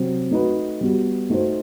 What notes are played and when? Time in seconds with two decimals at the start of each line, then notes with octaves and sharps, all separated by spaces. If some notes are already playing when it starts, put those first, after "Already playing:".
Already playing: C3 F#3 C4
0.31 A3 D#4 F#4 B4
0.81 G3 B3 F#4
1.30 A3 D#4 F#4 C5